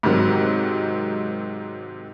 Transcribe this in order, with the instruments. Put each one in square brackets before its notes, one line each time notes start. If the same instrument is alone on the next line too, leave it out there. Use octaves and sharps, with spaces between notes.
[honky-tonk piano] G#2 C3 D#3 F#3